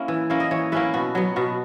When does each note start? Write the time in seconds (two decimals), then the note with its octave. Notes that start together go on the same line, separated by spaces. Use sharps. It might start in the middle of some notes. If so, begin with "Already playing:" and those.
Already playing: A#3 C#4 E4
0.08 E3
0.30 A#3 C#4 E4
0.40 D#5
0.51 E3 C#5
0.72 A#3 C#4 E4 B4
0.94 B2 F#4
1.15 F#3 B3
1.36 B2 F#4